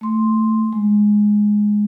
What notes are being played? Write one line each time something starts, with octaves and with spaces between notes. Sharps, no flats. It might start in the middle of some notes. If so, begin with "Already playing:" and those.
A3 C6
G#3